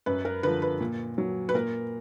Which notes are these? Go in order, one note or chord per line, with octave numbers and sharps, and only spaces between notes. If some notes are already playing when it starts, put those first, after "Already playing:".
F#2 B4
A#4
D3 F3 B4
B4
A#2
F#3
B4
A#2 A#4